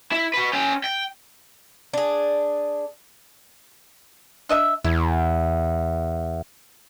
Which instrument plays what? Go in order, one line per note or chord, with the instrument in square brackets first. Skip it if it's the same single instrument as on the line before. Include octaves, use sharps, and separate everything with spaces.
[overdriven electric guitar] E4
F#4 B4
C#4 G5
G5
[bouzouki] D4 G#4
[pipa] D4 D#5 E5
[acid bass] E2 [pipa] E4